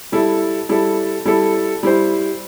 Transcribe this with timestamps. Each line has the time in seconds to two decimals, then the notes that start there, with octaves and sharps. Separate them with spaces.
0.12 G3 E4 A4
0.69 G3 E4 A4
1.25 G3 E4 A4
1.83 G3 E4 C5